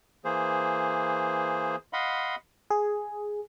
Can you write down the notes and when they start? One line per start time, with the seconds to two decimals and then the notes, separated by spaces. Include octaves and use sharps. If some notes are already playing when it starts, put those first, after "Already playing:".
0.25 E3 A#3 G#4 C5
1.93 D#5 F5 F#5 B5 C6
2.70 G#4